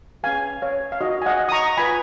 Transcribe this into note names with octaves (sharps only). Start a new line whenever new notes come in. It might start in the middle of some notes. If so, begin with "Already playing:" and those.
C#4 G#4 B4 F5 G#5
C#5 F5
F5
D#4 F#4 A#4 D#5
G#5
D#5 F#5
D#6
A#5 C#6
F4 B4 G#5 B5